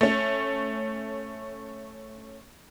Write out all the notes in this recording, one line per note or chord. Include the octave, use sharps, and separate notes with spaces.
A3 C#4